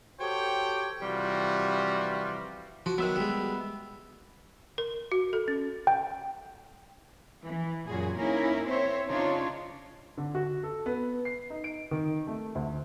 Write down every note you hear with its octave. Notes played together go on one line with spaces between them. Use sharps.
F#4 G4 A4 C5 C#5 G5
C3 E3 F3 G3 F4 F#4
F3 F#4
D#3 F#3 B3 E5 F#6
G3 G#3
A#4
F#4
A4
C#4
G5
E3
F#2 A#2 F#4 G#4
A#3 C#4 D#4 E4 A#4
C4 C5 C#5 E5
C#3 D4 D#4 F4 C#5
D3
F#4
A4
B3
C7
D#4
D7
D#3
A3
D2